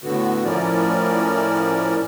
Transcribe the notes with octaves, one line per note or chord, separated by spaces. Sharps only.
A2 D3 B3 F#4
A2 F3 C#4 E4 A#4 D5